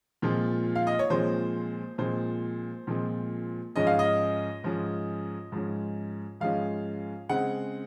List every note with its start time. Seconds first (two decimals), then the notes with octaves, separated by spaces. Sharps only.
0.22 A#2 F3 G#3 C4
0.76 F5
0.87 D#5
0.99 C#5
1.10 A#2 F3 G#3 C4 C5
1.98 A#2 F3 G#3 C4 C5
2.87 A#2 F3 G#3 C4
3.76 G#2 F3 G#3 C#4 D#5
3.87 F5
3.99 D#5
4.64 G#2 F3 G#3 C#4
5.52 G#2 F3 G#3 C#4
6.40 G#2 F3 G#3 C#4 F5
7.29 C#3 G#3 C4 F#5